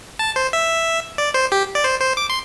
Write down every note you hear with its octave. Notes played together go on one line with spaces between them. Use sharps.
A5
C5
E5
D5
C5
G4
D5
C5
C5
D6
C6